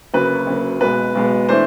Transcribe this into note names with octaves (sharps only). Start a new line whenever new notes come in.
D2 C#3 F#3 A#3 B4
D2 C#3 F#3 A#3
B1 B2 G#3 B3 B4
B1 B2 G#3 B3
E3 A3 D4 C5